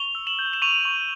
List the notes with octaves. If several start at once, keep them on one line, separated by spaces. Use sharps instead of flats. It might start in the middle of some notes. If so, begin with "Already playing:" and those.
Already playing: C#6 F7 G7
E6
E7 F#7
G6
E7
C#6 D#7 F7
C#6